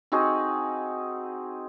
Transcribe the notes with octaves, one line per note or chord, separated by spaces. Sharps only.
C4 D#4 F#4 G#4